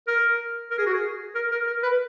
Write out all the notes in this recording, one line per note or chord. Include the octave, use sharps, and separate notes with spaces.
A#4
A#4
G#4
F#4
G#4
A#4
A#4
A#4
B4